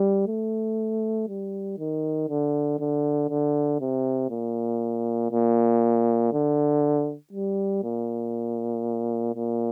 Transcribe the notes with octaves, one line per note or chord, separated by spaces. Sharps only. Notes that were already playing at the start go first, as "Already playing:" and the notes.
Already playing: G3
A3
G3
D#3
D3
D3
D3
C3
A#2
A#2
D3
G3
A#2
A#2